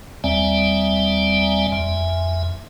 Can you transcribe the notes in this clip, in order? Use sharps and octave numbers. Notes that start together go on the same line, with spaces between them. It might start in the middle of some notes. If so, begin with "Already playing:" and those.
D#2 G3 C4 D5 E5 G#5
F2 E5 G#5